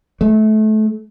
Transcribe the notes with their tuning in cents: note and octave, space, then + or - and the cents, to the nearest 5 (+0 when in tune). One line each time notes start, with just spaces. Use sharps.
A3 -25